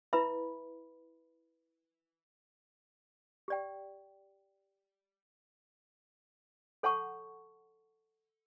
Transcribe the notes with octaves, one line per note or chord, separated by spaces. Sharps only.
E4 B4 E5 B5
G4 D5 G5
A4 C#5 F#5 A5 C#6